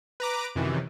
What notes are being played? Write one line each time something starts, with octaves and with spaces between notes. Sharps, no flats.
B4 A#5 D6
F#2 C3 D#3 E3